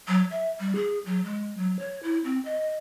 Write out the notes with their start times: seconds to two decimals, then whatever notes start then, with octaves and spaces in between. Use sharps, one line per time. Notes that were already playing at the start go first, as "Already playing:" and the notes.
0.08 F#3
0.31 E5
0.60 G3
0.75 G#4
1.06 F#3
1.24 G#3
1.57 F#3
1.79 C#5
2.03 E4
2.24 C4
2.45 D#5